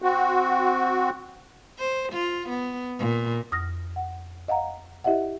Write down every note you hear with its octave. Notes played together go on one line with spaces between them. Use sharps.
C4 F#4
C5
F4
B3
A#2
F2 D#6 F6 A#6
F#5
D#5 F5 F#5 A#5
E4 G4 D#5 E5 F#5